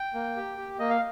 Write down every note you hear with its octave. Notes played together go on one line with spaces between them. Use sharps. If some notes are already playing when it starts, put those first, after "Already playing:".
Already playing: G5
A#3
G4
G4
A#3 D#5
F5